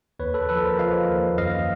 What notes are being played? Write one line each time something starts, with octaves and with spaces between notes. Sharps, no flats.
D#2 B4 C#5
A4 B4
F3 A4 B4
A#4 C5
F3 D#5 F5
D#2
F#2 D#5 F5